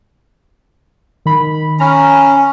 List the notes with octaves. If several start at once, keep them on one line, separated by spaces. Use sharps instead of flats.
D#3 B5
C#4 A#5 B5 F6